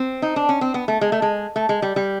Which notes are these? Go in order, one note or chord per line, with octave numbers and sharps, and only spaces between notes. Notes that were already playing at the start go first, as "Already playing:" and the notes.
Already playing: C4
D#4
D4
C#4
C4
B3
A3
G#3
A3
G#3
A3
G#3
G3
G3